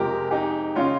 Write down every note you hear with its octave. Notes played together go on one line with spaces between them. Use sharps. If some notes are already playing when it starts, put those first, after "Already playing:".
Already playing: F2 C3 F3 G#3 G4 A#4
D#4 G4
C#3 G#3 C#4 F4